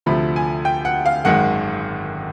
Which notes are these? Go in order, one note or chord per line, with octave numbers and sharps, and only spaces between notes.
D2 C3 F3 A3 B5
G#5
G5
F#5
F5
G#1 F#2 D#3 G#3 F#5